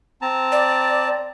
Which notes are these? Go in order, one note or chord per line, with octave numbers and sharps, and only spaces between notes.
C4 A5 A#5
D5